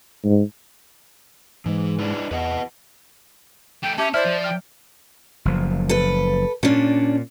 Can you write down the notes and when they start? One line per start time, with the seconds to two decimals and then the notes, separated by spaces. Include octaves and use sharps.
0.24 G#2
1.66 G#2 E3 G#3
1.99 D4 E4 B4
2.31 E2 B4 D#5 F#5
3.83 A3 G4 G5
3.98 C#4 G4 E5 A5
4.14 E4 C5 D5 E5 F6
4.25 F3
4.44 G5 F6
5.45 F#1 F3
5.89 A4 B4
6.63 A#2 C#4 D4